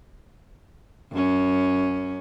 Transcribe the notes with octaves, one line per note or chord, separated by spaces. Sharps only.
F#2 C#4